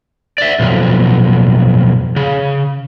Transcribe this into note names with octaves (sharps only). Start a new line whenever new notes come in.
D5 E5
B1 F2
C#3